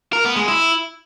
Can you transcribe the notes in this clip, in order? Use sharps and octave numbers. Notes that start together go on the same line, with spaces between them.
A#4
B3
G#3
E4